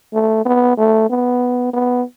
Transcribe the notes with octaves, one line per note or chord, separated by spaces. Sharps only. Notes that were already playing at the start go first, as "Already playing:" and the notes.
A3
B3
A3
B3
B3